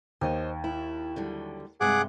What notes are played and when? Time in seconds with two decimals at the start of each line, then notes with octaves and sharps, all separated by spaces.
0.21 D#2 C5 C#5 D#5
0.64 E4
1.16 D3 F#3 G3
1.81 G2 C3 G#3 G#4 F#5 D6